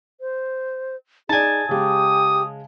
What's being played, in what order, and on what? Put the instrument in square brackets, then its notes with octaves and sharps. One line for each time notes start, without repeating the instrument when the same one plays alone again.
[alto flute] C5
[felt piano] D#4 D5 [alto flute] G#4 [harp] G#5 A5
[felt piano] C#3 G#3 [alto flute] G4 [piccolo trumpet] D#6